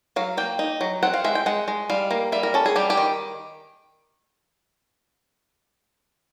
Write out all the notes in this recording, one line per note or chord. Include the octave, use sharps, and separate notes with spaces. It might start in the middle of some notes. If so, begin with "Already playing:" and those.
F#3 F5
A#3 G5
D#4
F#3
C4 F#5
F5
G#3 E5
G5
G#3 F#5
G#3
G3 F5
A#3
G3 E5
A#4
C#4 A4
G#4
G3 G4
G4
D#3